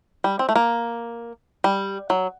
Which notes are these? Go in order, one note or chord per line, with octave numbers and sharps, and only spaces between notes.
G3
C4
A3
A#3
G3
F#3